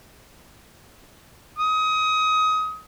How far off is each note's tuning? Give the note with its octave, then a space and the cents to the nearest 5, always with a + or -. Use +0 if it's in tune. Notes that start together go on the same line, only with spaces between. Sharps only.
D#6 +25